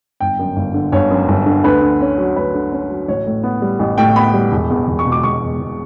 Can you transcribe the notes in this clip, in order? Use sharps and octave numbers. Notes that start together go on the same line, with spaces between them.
G1 G5
F#2
G1
D3
G1 C#5
F#2
G1
D3
D2 B4
D3
C#4
F#3
D2 B4
D3
C#4
F#3
A1 C#5
A2
B3
G3
A1
A2 G5
B3 B5
G3
E1
E2
E1
C#6
B2
D6
E1 C#6
E2
E1